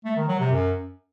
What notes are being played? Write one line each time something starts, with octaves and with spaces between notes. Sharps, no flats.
A3
D#3
F#3
C3
F#2